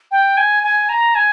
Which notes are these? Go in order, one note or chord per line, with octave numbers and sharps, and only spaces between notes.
G5
G#5
G#5
A#5
G#5